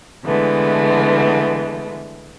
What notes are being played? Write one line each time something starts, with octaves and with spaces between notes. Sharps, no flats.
D3 E3 G#3 A3 B3